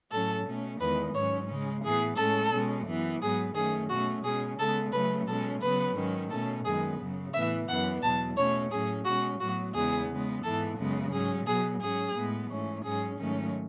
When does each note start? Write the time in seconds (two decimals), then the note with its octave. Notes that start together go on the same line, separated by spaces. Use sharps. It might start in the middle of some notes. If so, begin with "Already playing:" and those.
0.11 A2 F#3 C#4 A4
0.45 B2 A3 C#4
0.79 E2 D#3 G#3 B3 B4
1.14 G#2 F#3 C#4 C#5
1.48 C#3 G#3 C#4
1.82 A2 E3 B3 G#4
2.17 A2 G#3 C#4 A4
2.52 B2 G#3 C#4
2.86 F#2 E3 B3
3.20 G#2 F#3 B3 G#4
3.55 F#2 D#3 A3 C#4 G#4
3.89 B2 A3 C#4 F#4
4.23 B2 G#3 C#4 G#4
4.59 C#3 G#3 B3 A4
4.92 C#3 F#3 A3 C#4 B4
5.27 B2 G#3 C#4 A4
5.61 C#3 F#3 B3 B4
5.95 G#2 D#3 F#3 C#4
6.30 B2 A3 C#4 A4
6.65 F#2 D#3 G#3 B3 G#4
6.99 F#2 C#3 F#3
7.33 A2 E3 B3 E5
7.68 F#2 E3 B3 F#5
8.02 E2 B2 F#3 A5
8.36 B2 A3 C#4 C#5
8.71 A2 F#3 C#4 G#4
9.05 B2 G#3 C#4 F#4
9.39 A2 F#3 B3 F#4
9.74 E2 C#3 G#3 B3 G#4
10.09 C#3 G#3 B3
10.44 G#2 E3 B3 A4
10.78 F#2 C#3 G#3 B3
11.12 G#2 F#3 C#4 G#4
11.46 B2 F#3 B3 G#4
11.81 G#2 F#3 C#4 G#4
12.15 A2 G#3 B3
12.49 G#2 E3 A3 C#4
12.84 G#2 F#3 C#4 G#4
13.18 G#2 D#3 F#3 A3 C#4